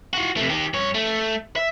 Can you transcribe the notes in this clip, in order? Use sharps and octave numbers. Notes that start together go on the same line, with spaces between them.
F4 F#4
C3 A3
D#3 G4
G2 C#5
A3
E5